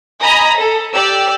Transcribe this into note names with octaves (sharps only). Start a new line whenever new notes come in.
D#5 G#5 A#5 B5 D#6
A4
G4 D5 E6